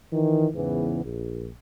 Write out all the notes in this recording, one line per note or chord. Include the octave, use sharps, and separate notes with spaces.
D#3 E3
E2 G#2 C#3 E3 B3
A#1